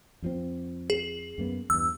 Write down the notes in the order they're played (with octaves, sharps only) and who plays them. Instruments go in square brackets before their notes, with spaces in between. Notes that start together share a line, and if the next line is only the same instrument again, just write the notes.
[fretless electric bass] F2 F3 C4
[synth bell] G#4
[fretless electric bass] F#2 A#3 B3
[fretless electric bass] E2 G2 [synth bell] E6